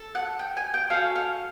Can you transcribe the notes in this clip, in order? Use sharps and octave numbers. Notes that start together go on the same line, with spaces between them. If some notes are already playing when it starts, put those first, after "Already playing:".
Already playing: A4
F#5
G5
G#5
G5
C#4 F#4 A4 F5
F5